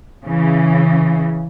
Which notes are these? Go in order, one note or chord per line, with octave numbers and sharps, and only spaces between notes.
C#3 E3